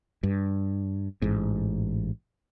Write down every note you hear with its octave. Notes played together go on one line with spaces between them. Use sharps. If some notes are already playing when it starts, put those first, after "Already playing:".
G2
A1 G#2